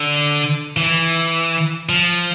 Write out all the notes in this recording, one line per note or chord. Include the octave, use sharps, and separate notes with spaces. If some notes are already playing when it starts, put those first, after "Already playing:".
Already playing: D3
E3
F3